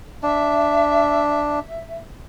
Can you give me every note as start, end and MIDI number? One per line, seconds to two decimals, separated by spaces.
0.23 1.59 62
0.23 1.97 76